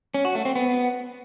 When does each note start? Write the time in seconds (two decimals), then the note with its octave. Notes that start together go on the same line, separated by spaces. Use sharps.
0.14 C#4
0.25 F#4
0.35 A3
0.45 C4
0.56 B3